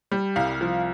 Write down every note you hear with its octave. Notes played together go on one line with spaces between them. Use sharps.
G3
C2 F5
F3